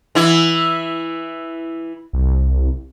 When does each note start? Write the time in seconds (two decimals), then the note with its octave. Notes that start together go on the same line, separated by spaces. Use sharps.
0.15 E3 E4
2.13 C2